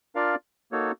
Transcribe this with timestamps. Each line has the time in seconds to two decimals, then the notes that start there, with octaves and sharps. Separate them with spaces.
0.15 D4 F4 A#4 D5 F5
0.72 A#3 D#4 F#4 A4 C#5